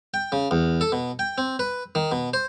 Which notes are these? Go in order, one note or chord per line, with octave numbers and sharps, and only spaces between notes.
G5
C#3
E2
A4
B2
G5
C4
B4
D#3
B2
C5